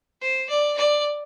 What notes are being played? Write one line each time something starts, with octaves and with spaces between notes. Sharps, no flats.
C5
D5
D5